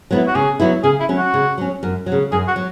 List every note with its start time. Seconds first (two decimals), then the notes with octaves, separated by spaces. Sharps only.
0.11 F#3 B3 E4
0.28 F#4
0.35 C#3 G#4
0.60 F#3 B3 E4
0.84 C#3 G#4
1.00 E4
1.09 F#3 C#4
1.17 F#4
1.34 C#3
1.58 F#3 C#4
1.83 F#2
2.06 F#3
2.12 C#3
2.32 F#2 G#4
2.48 F#4
2.56 F#3